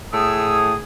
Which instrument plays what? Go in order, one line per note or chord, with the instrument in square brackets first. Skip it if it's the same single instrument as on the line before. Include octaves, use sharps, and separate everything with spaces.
[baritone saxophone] A2 [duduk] G#4 [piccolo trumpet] D#6 [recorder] E6